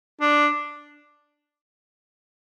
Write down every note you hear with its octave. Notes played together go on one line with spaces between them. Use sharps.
D4